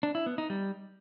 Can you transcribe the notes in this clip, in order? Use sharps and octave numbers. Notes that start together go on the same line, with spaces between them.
D4
E4
B3
D#4
G3